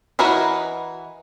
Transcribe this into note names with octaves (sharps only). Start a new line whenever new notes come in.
E3 F#4 A#4 B4 D#5